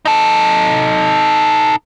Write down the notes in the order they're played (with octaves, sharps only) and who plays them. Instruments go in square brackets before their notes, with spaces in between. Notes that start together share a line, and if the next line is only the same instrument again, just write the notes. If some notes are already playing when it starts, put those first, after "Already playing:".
[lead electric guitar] D#4 A4